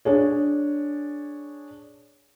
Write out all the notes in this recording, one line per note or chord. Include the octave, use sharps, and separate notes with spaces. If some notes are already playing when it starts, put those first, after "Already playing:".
D4 G#4 C#5